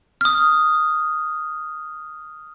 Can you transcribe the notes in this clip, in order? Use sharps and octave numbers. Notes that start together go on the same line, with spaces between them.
D#6 F6